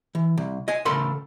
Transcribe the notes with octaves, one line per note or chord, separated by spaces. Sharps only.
E3
C2
D#5 G#5
C#3 A3 A4 A#4 B5 C6